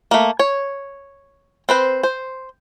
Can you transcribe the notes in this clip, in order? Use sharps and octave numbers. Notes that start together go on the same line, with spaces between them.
A3 A#3
C#5
C4 B4 C5
C5